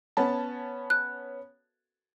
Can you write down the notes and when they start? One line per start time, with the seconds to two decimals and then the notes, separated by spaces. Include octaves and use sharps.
0.17 B3 C#4 A5
0.90 F#6